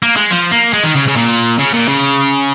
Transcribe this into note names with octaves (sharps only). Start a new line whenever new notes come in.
A#3
G#3
F3
A#3
G#3
D#3
C#3
C#3
A#2
C#3
A#2
C#3